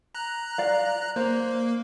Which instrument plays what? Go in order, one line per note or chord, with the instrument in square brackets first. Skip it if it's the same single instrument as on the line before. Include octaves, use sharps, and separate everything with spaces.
[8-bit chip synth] A#5 F#6
[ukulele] D5 F5
[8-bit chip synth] A#3 [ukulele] C5